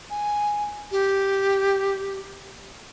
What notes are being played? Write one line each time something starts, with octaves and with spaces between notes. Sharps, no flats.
G#5
G4